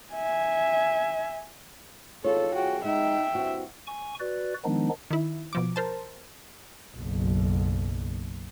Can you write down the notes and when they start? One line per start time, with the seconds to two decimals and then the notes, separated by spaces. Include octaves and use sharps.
0.13 E5 G#5
2.24 G#1 E2 G#2 F4 A4 C#5
2.54 C2 F#4 G#4 G5
2.84 G#3 D#4 E5 G5
3.35 G2 C4 E4 F#4
3.87 G#5 C#6
4.20 F#4 B4 D5
4.65 D#3 F3 G#3 B3 D4 D#4
5.11 D#3 E4
5.53 B2 F3 D6
5.76 A#4 C5 A5
6.96 F#1 B1